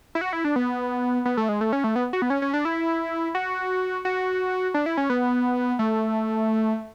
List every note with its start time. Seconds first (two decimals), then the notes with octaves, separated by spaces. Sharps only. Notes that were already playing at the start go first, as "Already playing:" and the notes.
0.15 E4
0.21 F#4
0.33 E4
0.44 D4
0.56 B3
1.25 B3
1.37 A3
1.49 G#3
1.61 A3
1.73 C#4
1.84 A3
1.96 B3
2.13 F#4
2.22 B3
2.30 C#4
2.42 C#4
2.54 D4
2.65 E4
3.35 F#4
4.05 F#4
4.74 D4
4.86 E4
4.97 C#4
5.10 B3
5.79 A3